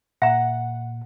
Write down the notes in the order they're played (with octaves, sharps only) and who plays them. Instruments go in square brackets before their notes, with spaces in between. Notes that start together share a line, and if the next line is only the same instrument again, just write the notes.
[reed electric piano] A#2 [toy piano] E5 A#5 [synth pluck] F#5